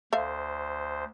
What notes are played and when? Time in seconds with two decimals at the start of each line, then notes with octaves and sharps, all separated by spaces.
0.13 D2 A4 C5 E5 F5